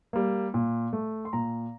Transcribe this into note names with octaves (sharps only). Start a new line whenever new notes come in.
G3 A#3
A#2
A3
C6
A#2 A#5